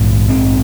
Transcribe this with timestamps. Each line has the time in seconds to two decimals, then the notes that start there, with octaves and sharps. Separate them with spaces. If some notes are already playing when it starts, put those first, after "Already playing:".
Already playing: A#1 G#2
0.29 C4